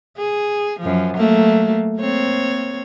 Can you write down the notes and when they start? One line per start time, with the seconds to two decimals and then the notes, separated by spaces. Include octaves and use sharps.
0.17 G#4
0.80 F#2 F3
1.17 F#3 A3 A#3
1.98 A#3 C4 C#5